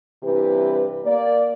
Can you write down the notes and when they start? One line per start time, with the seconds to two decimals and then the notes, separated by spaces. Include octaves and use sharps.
0.23 G2 C3 E3 G4 B4
1.05 A#3 D5